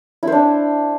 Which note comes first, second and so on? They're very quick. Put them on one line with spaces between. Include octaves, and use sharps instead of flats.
E4 C5 D4